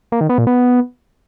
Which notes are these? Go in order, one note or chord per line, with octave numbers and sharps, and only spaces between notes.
A#3
D#3
B3
A#2
B3